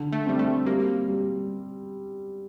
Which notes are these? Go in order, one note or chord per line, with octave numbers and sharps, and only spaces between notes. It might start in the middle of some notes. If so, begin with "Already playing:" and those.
Already playing: D3
A3
G3 C4
A3
G3 A#3
G3